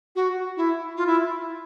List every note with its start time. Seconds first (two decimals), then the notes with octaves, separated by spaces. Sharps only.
0.16 F#4
0.57 E4
0.97 F4
1.07 E4